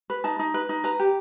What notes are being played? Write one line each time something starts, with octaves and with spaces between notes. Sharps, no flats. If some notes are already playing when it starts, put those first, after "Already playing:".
B4
D#4 A5
D#4
B4
D#4
B4 A#5
G4